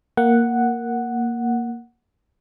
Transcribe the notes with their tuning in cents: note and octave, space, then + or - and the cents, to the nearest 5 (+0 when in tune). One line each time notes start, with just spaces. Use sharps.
A#3 +0 F#5 +0